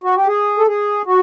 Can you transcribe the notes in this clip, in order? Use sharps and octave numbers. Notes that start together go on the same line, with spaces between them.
F#4
G4
G#4
A4
G#4
F#4